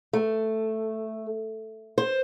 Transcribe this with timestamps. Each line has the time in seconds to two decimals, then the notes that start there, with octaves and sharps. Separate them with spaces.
0.13 A3
1.98 C5